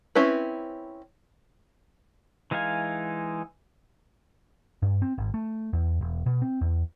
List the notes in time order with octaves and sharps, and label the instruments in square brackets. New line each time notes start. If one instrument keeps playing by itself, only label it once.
[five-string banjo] C4 C#4 E4 B4
[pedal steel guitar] E3 G#3 D#4 F5 G#5
[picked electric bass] G2
C4
G#1
A3
E2
E1
B2
C4
E2